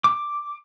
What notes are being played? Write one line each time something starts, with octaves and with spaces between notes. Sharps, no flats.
D6